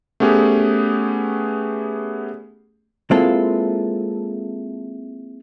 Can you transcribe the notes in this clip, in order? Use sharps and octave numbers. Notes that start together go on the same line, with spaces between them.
A3 B3 C#4 G4 G#4
G#3 A#3 C4 E4 F4 A4